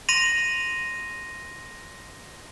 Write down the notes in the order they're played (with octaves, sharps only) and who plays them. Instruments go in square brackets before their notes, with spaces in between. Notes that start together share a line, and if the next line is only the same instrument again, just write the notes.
[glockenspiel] C6 A#6 D#7 F7